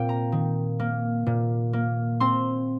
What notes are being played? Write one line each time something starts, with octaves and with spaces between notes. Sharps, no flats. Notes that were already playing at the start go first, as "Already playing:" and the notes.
Already playing: A#2 C4 F5 G5
A#5
D#3
A#3
A#2
A#3
C4 C6